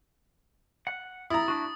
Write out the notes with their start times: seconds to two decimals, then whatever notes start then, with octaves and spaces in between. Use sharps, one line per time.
0.87 F#5
1.30 E4 A#5 D#6 A6
1.48 D4 F#4